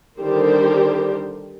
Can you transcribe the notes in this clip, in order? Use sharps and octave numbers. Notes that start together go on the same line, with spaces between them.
D3 D#3 G3 G4 A#4 C5